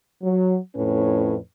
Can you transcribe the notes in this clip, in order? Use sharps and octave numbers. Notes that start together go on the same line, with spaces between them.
F#3
F2 A2 C#4 B4